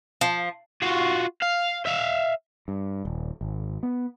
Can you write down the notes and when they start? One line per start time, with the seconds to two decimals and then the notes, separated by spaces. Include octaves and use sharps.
0.21 F3
0.82 F4 F#4
1.42 F5
1.86 E5 F5
2.68 G2
3.05 D#1
3.41 G#1
3.83 B3